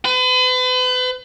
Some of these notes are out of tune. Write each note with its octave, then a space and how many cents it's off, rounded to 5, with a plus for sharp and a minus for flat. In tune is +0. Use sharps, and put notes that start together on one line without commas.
B4 +40